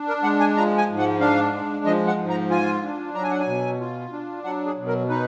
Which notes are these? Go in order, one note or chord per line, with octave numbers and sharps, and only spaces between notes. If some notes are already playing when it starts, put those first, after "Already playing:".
Already playing: D4
A#4
G#3 F#5
G#5
F3 A#5
G#5
G#2
F#5
D4 F5
G#3
F3 D#5
F#5
G#2
A#5
F4 G#5
D4
F#3 A#5
G#5
F#5
G#5
B2
F4
D4
F#3 F#5
G#4
B2
A#4
D#4 B4